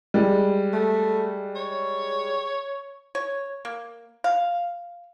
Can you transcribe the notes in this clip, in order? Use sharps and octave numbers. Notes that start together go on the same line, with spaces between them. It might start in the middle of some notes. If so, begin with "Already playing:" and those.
G3 G#3
A3
C#5
C#5
A#3
F5